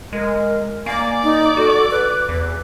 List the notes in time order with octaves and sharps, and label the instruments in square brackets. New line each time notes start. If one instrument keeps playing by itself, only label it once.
[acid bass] G#3 [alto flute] A#4
[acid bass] A#3 [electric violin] D5 D6 [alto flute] G#5
[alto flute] D#4
[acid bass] F#4 [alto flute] A4
[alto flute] B4
[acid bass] E2